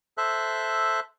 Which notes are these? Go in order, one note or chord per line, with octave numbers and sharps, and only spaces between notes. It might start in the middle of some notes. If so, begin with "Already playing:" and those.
A4 C5 E5 F#6